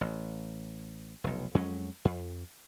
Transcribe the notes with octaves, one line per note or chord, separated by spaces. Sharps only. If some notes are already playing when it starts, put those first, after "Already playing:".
A1
F1 B1
F2 F#3 G#3 C#4
F2